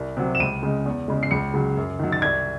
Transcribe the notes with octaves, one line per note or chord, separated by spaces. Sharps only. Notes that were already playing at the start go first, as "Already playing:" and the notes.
Already playing: C2
C3 F#3
E7
C#2 D#7
C#3 G#3
E2
C#3 G#3
C7
C#2 C#7
C#3 F#3
F#2
D#3 F#3
A6
C2 G#6